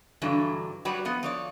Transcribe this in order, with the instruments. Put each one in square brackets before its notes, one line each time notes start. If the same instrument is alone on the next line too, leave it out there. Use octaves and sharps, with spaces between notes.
[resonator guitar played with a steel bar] G2 D3 E3 F#3
F#3 G3 F#4 B4 D5
F3 B3
F3 C#5 D5